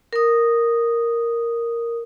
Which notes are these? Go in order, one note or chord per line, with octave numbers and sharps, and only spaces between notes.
A#4 D#6